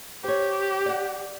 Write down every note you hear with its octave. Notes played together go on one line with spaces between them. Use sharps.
G4 C5 C#5
D5 F#5